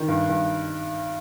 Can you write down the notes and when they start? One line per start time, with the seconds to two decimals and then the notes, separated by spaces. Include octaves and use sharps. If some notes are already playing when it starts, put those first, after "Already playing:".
Already playing: D#3
0.08 G2
0.29 G2